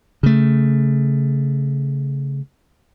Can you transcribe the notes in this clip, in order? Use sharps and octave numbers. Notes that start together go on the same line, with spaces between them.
C#3 A3